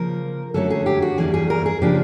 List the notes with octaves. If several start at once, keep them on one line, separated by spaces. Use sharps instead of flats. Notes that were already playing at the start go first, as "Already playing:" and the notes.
Already playing: C#3 F3 A#3 A#4
D3 F#3 A3 C#4 A4
G#4
G4
F#4
E2 C#3 E3 G3 A#3 G#4
G#4
A#4
G#4
C#3 F3 A#3 D4 G4